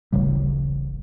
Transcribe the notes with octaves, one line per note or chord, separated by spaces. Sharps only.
D1 A1 C#3 G3